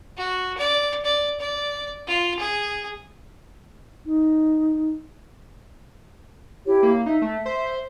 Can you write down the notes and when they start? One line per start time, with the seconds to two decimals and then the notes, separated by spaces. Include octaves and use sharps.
0.17 F#4
0.58 D5
1.05 D5
1.40 D5
2.07 F4
2.40 G#4
4.06 D#4
6.65 E4 G4 C#5
6.83 A#3
7.06 D#4 E5
7.22 A3
7.45 C5